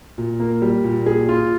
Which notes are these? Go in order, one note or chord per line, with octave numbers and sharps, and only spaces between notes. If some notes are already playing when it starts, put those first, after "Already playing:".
A#2
A#3
G3
A#2
G#4
F4